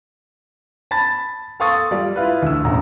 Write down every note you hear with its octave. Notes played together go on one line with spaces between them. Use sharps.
A5 B5 A6
A4 F5 C6 C#6 D#6 A6
G3 F4 D5
E4 F4 B4
D2 E6
E1 A1 A#5